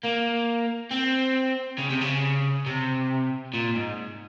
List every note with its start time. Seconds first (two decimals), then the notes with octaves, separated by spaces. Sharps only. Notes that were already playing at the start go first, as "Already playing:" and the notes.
0.03 A#3
0.91 C4
1.78 C#3
1.90 C3
2.01 C#3
2.66 C3
3.54 A#2
3.75 G#2